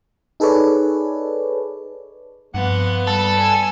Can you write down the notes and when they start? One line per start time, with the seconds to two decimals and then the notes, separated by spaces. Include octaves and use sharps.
0.40 D#4 G#4 A4 B4 C#5 D5
2.54 G2 F3 A#3 B3 F#5
3.07 G3 A4
3.39 G#5 E6